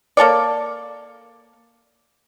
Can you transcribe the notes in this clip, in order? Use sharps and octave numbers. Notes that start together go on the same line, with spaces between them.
A#3 A4 C#5 D5